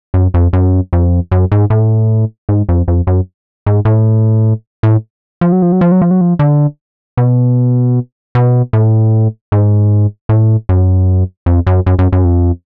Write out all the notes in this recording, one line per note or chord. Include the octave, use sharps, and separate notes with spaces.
F#2
F2
F#2
F2
F#2
G#2
A2
G#2
F2
F2
F#2
G#2
A2
A2
F3
F#3
F3
F#3
F3
F#3
F3
F#3
F3
D3
B2
B2
A2
G#2
A2
F#2
F2
F#2
F#2
F#2
F#2
F2